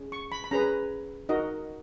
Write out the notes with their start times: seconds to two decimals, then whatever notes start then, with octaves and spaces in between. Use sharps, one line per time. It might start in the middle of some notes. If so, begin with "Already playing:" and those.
Already playing: C#4 G#4
0.12 C#6
0.32 B5
0.44 B5
0.51 C#4 G#4 B4 A#5
1.29 D#4 F#4 A#4 D#5